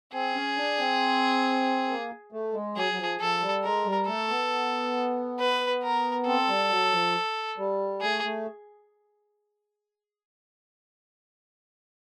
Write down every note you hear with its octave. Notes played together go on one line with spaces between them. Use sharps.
C4 G#4
C#4
D4
C4
A#3
A3
G#3
F#3 G#4
F#3
F3
F3 A4
G3
G#3 A#4
G3
A3 A4
B3
B4
A#4
C4 A4
G3
F#3
F3
G3
A3 G#4
A3